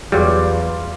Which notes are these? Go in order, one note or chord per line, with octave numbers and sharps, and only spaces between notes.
E2 F#3 G3 F4 G#4 D5